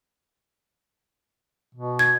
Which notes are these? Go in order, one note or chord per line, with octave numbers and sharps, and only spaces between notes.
B2
G#6